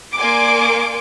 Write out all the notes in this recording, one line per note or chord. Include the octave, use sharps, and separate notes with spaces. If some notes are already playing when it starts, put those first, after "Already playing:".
A#3 D5 G#5 C6 D6 D7